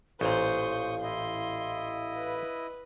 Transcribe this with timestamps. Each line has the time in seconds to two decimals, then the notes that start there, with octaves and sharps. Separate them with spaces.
0.21 A1 A#2 C5 F5 C#6 D#6 G6
1.03 E4 D#5 C6
2.16 B4